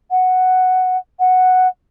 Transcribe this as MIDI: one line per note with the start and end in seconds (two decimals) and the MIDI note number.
0.11 0.97 78
1.20 1.68 78